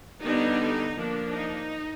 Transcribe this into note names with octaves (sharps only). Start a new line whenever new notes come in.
D3 G3 B3 D4 D#4
F3 A#3 D4
D#4